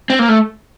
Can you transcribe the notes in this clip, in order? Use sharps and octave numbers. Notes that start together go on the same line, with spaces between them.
C4
A#3
A3